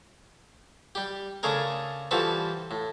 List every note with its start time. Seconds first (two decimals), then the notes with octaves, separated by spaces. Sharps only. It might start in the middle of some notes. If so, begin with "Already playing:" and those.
0.95 G3 G4
1.43 C#3 A3 D4 G#4 A#4
2.11 E3 F3 G3 F#4 A4 B4
2.71 A2